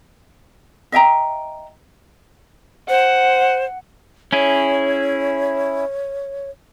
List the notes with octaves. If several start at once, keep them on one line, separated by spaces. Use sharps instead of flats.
D#5 E5 G5 A#5
C5 F#5
C#4 E4 G#4 C#5